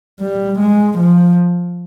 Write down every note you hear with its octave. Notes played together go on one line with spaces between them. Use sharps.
G3
G#3
F3